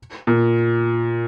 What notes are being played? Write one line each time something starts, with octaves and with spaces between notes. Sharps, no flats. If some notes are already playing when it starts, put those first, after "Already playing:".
A#2